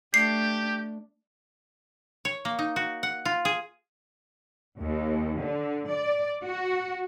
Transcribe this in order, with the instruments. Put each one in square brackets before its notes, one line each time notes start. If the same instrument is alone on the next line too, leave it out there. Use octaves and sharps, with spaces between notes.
[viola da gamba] A3 D4 [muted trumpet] G4 [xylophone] C7
[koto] C#5
A#3
D#4
F#4
F#5
F4
G#4
[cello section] D#2
D3
D5
F#4